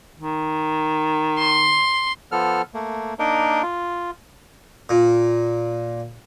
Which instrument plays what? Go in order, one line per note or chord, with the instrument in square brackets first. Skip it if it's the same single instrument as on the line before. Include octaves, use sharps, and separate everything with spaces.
[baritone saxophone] D#3
[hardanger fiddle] C6
[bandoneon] F3 B3 A4 F6
A3 A#3
A#3 D4 D#4 A#4
F4
[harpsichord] A#2